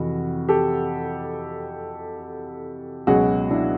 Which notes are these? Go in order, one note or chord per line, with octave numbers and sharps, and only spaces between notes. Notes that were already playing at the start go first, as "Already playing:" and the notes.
Already playing: F2 C3 E3 F#4
G4 A4
C#2 B2 F#3 F#4 G#4
D4 E4